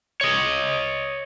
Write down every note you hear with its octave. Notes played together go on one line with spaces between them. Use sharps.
C#5 D#5